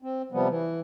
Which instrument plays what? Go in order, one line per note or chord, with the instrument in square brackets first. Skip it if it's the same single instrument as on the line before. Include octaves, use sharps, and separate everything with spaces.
[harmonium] C4
C3 F3 G3 B3
E3